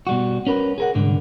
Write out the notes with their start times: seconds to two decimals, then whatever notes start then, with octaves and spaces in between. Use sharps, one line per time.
0.07 B2 G3 F#4
0.47 C#4 A#4 B4
0.78 G#4 A#4 F#5
0.95 C2 G#2 D3